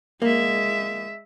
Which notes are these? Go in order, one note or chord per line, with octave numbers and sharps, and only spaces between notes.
G#3 A#3 E5